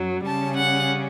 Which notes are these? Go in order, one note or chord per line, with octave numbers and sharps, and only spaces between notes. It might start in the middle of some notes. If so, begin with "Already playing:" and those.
Already playing: F#2 F#3
C#3 G3 C#4 A5
F#5